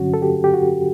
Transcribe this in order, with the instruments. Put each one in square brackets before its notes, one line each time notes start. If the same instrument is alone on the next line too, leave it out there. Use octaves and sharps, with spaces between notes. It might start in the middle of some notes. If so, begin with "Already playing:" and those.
Already playing: [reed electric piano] G2 D3 F#3 C#4 F#4
A4
G4
G4
F#4